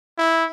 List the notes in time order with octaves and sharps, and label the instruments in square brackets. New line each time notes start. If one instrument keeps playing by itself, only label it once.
[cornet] E4